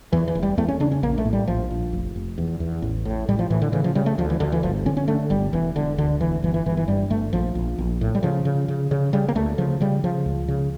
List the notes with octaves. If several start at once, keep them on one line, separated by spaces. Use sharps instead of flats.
E2 E3
E3
F1
G3
E2 A3
C#4
C#3 D4
C#4
A#1 A#3
A3
A2
G3
A#1 F3
A#1
F1
F1
E2
E2
A1
A2
A2 G3
F3
A2 E3
D3
C#3 E3
F3
C#3 G3
A3
D2 F3
E3
D2 D3
E3
G1 F3
D3 C#4
C#4
D3 A3
G1 G3
E1 E3
E1 D3
D2 D3
E1 E3
G1 E3
E3
G1 E3
E3
G2 G3
G1 A3
A#1 F3
A#1
A#1
A2
G3
C#3 F3
C#3
C#3
C#3
C#3 G3
A#3
D2 A3
C#3 F3
C#3 G3
C#3 F3
C#2
C#3